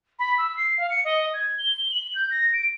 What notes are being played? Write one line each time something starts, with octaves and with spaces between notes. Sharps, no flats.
B5
E6
C7
F5
C#7
D#5
G#6
G7
F#7
G6
A#6
D7